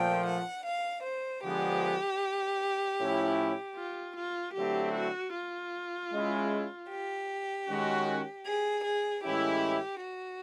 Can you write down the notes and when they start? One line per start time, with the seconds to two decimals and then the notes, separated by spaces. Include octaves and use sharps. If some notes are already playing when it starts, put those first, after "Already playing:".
Already playing: A#2 F3 A3 G5
0.26 F#5
0.65 F5
1.04 C5
1.43 D3 F3 G#3 B3 G4
2.99 A2 F3 A3 C#4 E4
3.77 F4
4.17 F4
4.55 D3 F#3 A3 C4 E4 G4
4.94 F#4
5.34 F4
6.12 G#3 C#4 E4
6.89 G4
7.68 D#3 G#3 C#4 F#4
8.46 G#4
8.86 G#4
9.24 A2 E3 G#3 C#4 E4 G4
10.03 F#4